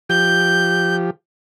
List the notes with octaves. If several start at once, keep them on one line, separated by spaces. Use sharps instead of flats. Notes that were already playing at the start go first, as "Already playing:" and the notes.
F3 G4 G6